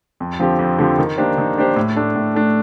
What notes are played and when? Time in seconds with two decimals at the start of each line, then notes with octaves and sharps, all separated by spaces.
0.20 F2
0.40 D3 F3 C4 G4
0.59 F2
0.79 D3 F3 C4 G4
0.98 D#3
1.18 A#3 D4 G4 C5
1.38 D#3
1.58 A#3 D4 G4 C5
1.76 A2
1.96 A3 D4
2.16 A2
2.35 A3 D4